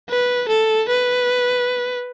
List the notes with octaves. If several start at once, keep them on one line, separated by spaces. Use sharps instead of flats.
B4
A4
B4